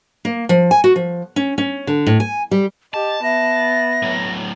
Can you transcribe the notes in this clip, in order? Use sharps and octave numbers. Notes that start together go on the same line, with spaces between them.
A#3
F3
G#5
F#4
F3
C#4
C#4
D3
A2
G#5
G3
G4 D#5 A5
B3 E5 A#6
A2 F#3